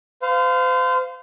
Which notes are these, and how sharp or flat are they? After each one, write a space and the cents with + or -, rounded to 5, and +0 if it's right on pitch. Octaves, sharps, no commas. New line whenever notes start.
C5 -35 F5 +0